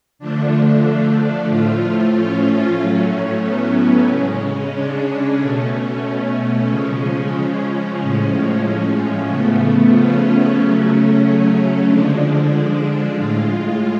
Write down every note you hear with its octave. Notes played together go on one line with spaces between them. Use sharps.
D3 F3 A3 D4
A2 F3 A3 F4
C#4
A2 F#3 A3
B3
C#3 G#3 C#4
D4
B2 A3 C#4
C#3 F3 G#3
A2 F3 G#3 C#4
C#3 F3 A3 B3
C#4
C#3 F#3 A3
D3 F3 G#3 D4
A2 G#3 F4